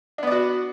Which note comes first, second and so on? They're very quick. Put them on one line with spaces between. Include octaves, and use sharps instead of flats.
D4 B3 D5 F#4